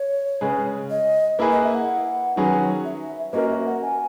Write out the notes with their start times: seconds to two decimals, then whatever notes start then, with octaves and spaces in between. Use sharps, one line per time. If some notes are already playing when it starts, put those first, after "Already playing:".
Already playing: C#5
0.41 C#3 G#3 C#4 G#4 B4
0.90 D#5
1.39 A#3 E4 G#4 B4
1.51 D#5
1.64 E5
1.75 F#5
2.36 D#3 F#3 C#4 G#4 B4
2.85 E5
3.33 A#3 C#4 F#4 A#4 D#5
3.50 E5
3.66 F#5
3.82 G#5